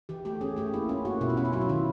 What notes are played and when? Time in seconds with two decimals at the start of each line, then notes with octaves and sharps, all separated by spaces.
0.09 E3 G4
0.25 A3 G4
0.41 C#4 G#4
0.56 A3 G4
0.73 A#3 E4
0.89 C#4 F4
1.05 A#3 F#4
1.21 B2 E4
1.29 F4
1.37 C#4 E4
1.45 F4
1.53 F#3 E4
1.61 F4
1.69 D#3 E4